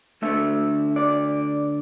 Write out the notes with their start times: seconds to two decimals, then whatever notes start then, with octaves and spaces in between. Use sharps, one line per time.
0.22 D2 D3 A3 E5
0.96 D5